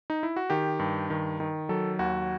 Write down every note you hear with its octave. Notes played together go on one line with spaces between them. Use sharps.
D#4
E4
F#4
D#3 G4
G2
D#3
D#3
F#3 A4
D#2 F#4